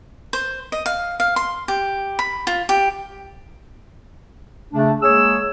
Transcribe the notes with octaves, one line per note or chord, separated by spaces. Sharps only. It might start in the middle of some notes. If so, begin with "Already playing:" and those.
C5
D#5
F5
F5
C6
G4
B5
F4
G4
C#3 A3 D4
G#3 A#3 G#4 C#5 E6